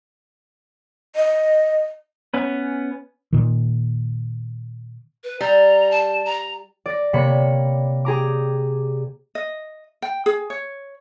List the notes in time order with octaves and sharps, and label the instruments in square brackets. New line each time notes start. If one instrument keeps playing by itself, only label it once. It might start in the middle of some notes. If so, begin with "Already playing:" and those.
[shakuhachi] D#5
[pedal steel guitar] B3 C#4 B4
[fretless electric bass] A#2 D#3
[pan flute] B4
[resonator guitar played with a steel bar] G3 [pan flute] A#5
[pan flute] A5
A#5
[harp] D5 A#6
C3 A#3 C#5 B5 C#7
G4 G#4 A#5 D6
[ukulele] D#5
G5
G#4
C#5